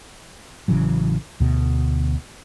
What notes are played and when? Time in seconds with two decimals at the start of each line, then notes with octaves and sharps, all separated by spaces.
0.68 A1 C#3 E3 F#3
1.40 D2 B2